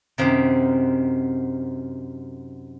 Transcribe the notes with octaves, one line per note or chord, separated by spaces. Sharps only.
F#2 C3 D#3